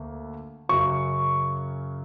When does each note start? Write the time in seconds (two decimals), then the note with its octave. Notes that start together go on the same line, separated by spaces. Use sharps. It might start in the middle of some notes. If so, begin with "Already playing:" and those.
Already playing: D2 D3 A#3
0.69 F#2 C#3 F#3 C#6